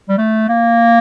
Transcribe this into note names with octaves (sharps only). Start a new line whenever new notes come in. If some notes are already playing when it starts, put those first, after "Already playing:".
G3
A3
A#3